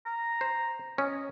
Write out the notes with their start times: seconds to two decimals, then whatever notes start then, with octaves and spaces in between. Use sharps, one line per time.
0.06 A#5
0.41 C5
0.98 C#4 D#5